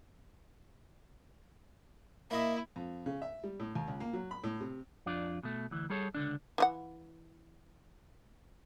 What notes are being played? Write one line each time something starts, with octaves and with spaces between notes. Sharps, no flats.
A#3 E4 D#5 E5
F2
C#3
E5
G3
A2
D#2
C#2
A#3
F#3
B5
A2
C3
F2 D4 F4 D5
B2 A3
D2 E3
G3 G#4 A4 C#5
C#2 D3 D4
E3 F4 F#5